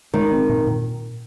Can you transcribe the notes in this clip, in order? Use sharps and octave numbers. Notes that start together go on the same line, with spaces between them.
D#3 G#3
C4
A#2
A#2